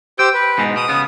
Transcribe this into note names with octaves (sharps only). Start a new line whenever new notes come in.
G4 C5 G5 E6
B4
G#2 B2 G#3
B2 D#6
C#3 B3